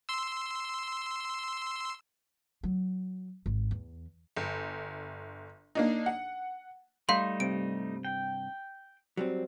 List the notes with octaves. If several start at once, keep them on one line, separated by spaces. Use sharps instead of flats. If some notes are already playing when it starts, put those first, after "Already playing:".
C6 E6
F#3
G#1
E2
G1
A#3 D4 D#4
F#5
G3 A3 D#4 F5 C6
G2 C3 D7
G5
F#3 G3 C4